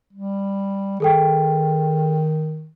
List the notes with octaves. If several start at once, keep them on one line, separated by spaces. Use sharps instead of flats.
G3
D#3 G#4 A4 G5